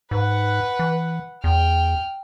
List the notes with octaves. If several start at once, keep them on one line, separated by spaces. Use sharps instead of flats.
G#2 B4 F#5
E3
E2 G5 F6